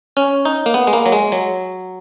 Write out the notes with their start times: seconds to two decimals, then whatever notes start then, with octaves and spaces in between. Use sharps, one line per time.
0.17 C#4
0.45 D#4
0.66 A#3
0.74 B3
0.87 G#3
0.93 A#3
1.06 F#3
1.12 G#3
1.32 F#3